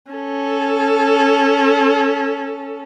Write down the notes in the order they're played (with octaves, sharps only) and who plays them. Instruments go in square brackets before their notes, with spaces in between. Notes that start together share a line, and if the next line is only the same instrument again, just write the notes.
[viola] C#4 A4